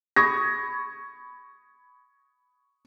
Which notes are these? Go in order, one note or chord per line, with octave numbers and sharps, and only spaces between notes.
B5 C#6 D#6 G#6 A#6